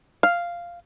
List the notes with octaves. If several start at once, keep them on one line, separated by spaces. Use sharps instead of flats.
F5